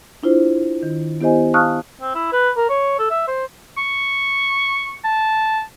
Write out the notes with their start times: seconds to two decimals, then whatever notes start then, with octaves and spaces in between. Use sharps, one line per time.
0.23 D4 E4 F4 C5
0.83 D#3
1.21 B3 E4 G4 C5 D#5 G#5
1.54 F5 A5 C#6 D#6 F6 F#6
2.01 C4
2.15 E4
2.32 B4
2.56 A#4
2.69 C#5
2.99 A4
3.10 E5
3.28 C5
3.78 C#6
5.04 A5